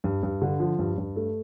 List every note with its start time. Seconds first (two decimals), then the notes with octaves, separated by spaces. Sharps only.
0.04 G2
0.23 G2
0.42 D3
0.60 F3
0.79 G2
0.98 G2
1.16 A3